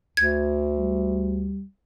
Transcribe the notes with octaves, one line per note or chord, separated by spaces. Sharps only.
D2 G#6
G3